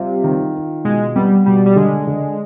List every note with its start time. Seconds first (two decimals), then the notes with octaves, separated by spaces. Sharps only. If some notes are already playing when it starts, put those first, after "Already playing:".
Already playing: C3 G3 F4
0.24 D#3
0.55 F4
0.84 B2 G#3
1.16 G3 B3
1.46 B2 G3
1.66 G3
1.76 D3 G#3
2.07 D3